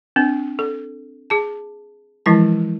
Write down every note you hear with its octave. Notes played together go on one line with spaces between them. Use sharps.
C4 D4
A4
G#4 A5
E3 F3 G#3 E4 A5